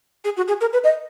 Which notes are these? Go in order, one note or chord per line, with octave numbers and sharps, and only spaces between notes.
G#4
F#4
G#4
A#4
B4
D#5